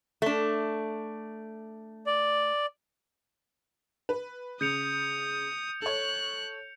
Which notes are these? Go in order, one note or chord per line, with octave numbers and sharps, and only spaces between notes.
A3 D4
D5
B4
C#3 D#6 G6 C#7 F7
A4 C#5 F#6